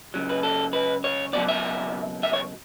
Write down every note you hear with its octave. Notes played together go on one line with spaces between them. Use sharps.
C#2 C#3 F#3
B4
A4
B4
C#5
C#2 B2 F#3 D5
E5
E5
C#5